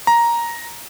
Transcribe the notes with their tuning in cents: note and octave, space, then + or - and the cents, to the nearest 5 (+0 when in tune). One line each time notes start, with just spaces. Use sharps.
A#5 +5